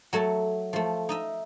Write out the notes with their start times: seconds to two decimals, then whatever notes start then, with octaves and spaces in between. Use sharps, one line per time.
0.13 F#3 A3 C#5 A5
0.73 F3 A3
1.09 D#4 D#5 E5